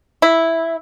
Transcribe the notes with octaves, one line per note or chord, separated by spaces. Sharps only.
E4